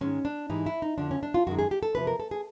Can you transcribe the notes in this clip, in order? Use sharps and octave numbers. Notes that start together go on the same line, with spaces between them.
G#2 D#3 G#3 C#4
D4
G#2 E3 G3 D#4
E4
D#4
F2 D3 F3 D4
C#4
D4
F4
F#2 D#3 G#3 F#4
G#4
G4
A4
E2 C3 F3 B4
A#4
A4
G#4